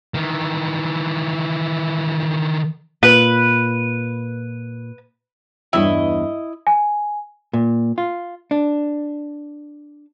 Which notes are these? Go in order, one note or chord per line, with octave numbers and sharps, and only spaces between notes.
D#3 E3
A#2 B4
E2 G2 E4 C#5 D#5
G#5
A#2
F4
D4